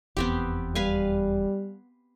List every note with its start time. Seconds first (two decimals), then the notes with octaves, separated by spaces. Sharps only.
0.17 F1 E2 B3 C4 G4
0.75 G3 B4 F5 G#5